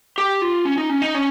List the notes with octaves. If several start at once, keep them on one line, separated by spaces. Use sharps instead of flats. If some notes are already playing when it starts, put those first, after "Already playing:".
G4
F4
C#4
D#4
C#4
D#4
C#4